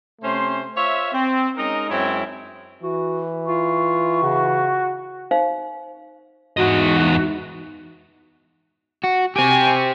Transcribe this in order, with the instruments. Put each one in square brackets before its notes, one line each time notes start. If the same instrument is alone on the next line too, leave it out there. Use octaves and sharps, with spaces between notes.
[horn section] C3 A3 C#4 C5 C6
F4 C5 C#5 E5
C4
G#3 C#4 D#4 A#4 D#5
F#2 G#3 C4 E4 C#5
[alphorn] E3 [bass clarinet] F#4
[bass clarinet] F4 [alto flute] C#6
[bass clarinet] C#3 [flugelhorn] F#4
[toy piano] D#4 C5 F5
[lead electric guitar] E2 D#5 [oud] G#2 E3 [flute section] F#4
[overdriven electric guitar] F#4
[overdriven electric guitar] C4 G4 [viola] G#5 C#6